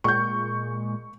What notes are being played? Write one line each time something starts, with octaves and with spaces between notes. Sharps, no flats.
A#2 G#3 C#6 G6